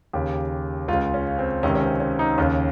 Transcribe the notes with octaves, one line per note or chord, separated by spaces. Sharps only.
D#2 C#3 G4
C#2 F4
C#3
C#4
C4
C#2 C3 D#3 C#4
C#4
C4
C#4
D#4
D#2 C#3 C#4